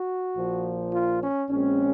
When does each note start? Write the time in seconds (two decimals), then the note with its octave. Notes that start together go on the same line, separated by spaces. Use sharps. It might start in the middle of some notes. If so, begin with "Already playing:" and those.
Already playing: F#4
0.35 A#1 A#2 F3
0.93 F4
1.21 C#4
1.49 A#1 A#2 G#3 C4 C#4